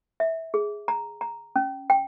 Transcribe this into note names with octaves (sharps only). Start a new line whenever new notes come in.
E5
G#4
A#5
A#5
C#4
G5